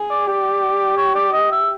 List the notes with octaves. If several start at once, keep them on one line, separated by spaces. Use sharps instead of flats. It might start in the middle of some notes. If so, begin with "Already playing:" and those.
Already playing: G#4
D5
G4 D5
C#5
D5
D#5
E5